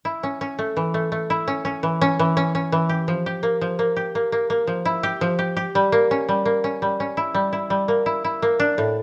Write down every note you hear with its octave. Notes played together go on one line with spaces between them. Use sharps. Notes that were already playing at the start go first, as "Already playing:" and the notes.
E4
C#4
C#4
A3
E3
A3
A3
E4
C#4
C#4
E3
C#4
E3
C#4
C#4
E3
G4
F3
G4
A#3
F3
A#3
G4
A#3
A#3
A#3
F3
E4
G4
F3
G4
G4
G3
A#3
C#4
G3
A#3
C#4
G3
C#4
E4
G3
E4
G3
A#3
E4
E4
A#3
D4
A2